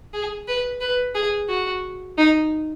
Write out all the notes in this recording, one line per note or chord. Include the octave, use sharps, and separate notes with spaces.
G#4
B4
B4
G#4
F#4
D#4